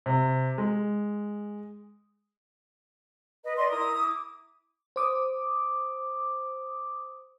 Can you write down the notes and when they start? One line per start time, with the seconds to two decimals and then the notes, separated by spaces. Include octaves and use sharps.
0.06 C3
0.58 G#3
3.44 B4 D#5
3.56 B4 D5 D#5 C6
3.70 E4 A#4 D#6
4.00 D6
4.96 C5 D6 D#6